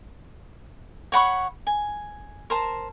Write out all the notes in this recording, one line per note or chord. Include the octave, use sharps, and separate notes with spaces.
C#5 F#5 B5 C#6
G#5
A#4 C5 A5